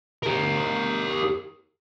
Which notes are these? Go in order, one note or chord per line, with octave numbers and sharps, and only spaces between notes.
G4 A#4